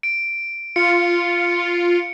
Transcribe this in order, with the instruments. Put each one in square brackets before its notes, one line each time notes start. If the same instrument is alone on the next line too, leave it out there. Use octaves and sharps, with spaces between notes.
[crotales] D7
[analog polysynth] F4 [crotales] C#7